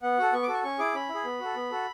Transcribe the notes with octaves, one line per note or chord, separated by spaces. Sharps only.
B3 F#5
F#4 A4
B3 C#6
D6
F#4 A4
C#6
C#4 C#6
E4 G#4 D6
C#4 B5
E4
G#4
B3
F#4 A4
B3
F#4 A4